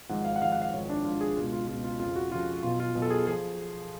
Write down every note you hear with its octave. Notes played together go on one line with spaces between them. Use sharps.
G#1 G#2 F3 F#5
F5
F#5
G#1 G#2 F3 F5
F#5
F5
G#1 G#2 F3 C#5
D4
G#1 G#2 F3 F4
G#4
C#2 B2 F4
F4
C#2 B2 F4
F4
F2 C#3 F3 F4
F#4
F2 C#3 F3 F4
B1 B2 F4
F4
B1 B2
A4
G#4
F3 G#4